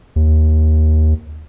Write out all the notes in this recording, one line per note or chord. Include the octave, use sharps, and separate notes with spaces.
D#2